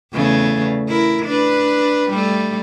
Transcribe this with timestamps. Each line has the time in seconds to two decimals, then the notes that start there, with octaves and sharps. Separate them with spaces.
0.13 E2 C#3 A3
0.89 E4 A#4
1.26 D4 B4
2.10 G3 A3